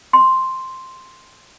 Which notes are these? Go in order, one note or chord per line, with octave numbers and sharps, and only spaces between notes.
C6